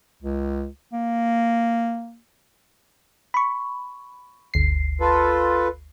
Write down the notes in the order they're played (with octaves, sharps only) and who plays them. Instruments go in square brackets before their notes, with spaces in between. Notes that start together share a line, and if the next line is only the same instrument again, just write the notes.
[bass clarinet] C#2
A#3
[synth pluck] B5 C#6
G1 D2 C7
[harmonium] F4 A4 B4